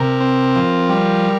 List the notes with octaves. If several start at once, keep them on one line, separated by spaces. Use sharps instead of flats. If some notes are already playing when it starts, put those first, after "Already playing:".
Already playing: C3 A#4
C4
F3
G3